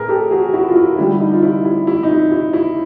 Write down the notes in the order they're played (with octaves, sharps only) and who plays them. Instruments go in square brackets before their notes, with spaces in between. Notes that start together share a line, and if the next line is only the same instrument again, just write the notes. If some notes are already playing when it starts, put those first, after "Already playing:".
Already playing: [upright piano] A2 G#4 A#4 B4
G4 A4
F#4 G#4
E4 F#4
F4
E4
D3 G3 E4
D#4
F4
E4
E4
E4
D#4
E4
E4
E4